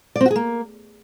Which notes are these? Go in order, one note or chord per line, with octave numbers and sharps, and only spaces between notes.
D5
C4
F#4
G#4
A#3